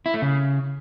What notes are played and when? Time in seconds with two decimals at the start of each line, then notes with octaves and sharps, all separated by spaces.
0.06 E4
0.14 A3
0.22 C#3